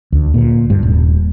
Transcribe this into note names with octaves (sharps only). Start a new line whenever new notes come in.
D2
A#2
G2
D#1